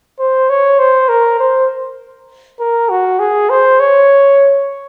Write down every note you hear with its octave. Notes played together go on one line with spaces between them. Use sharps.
C5
C#5
C5
A#4
C5
A#4
F#4
G#4
C5
C#5